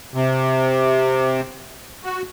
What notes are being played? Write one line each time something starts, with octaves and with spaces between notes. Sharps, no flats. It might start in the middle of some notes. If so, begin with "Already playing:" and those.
C3
F#4